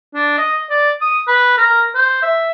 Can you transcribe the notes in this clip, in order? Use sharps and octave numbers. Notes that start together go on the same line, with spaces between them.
D4
D#5
D5
D#6
B4
A#4
C5
E5